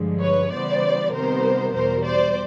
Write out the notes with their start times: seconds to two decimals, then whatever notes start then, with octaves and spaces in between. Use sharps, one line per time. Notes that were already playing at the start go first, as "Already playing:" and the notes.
Already playing: G2 D3 F3 G#3
0.21 B4 C#5
0.51 C#3 E3 G3 B3 C5 D5
1.13 C3 D#3 G3 B3 A#4 C5
1.74 E2 B2 G3 A#4 C5
2.04 C5 D5